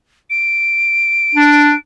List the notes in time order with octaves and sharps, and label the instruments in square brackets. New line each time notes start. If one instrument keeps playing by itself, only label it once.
[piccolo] D7
[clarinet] D4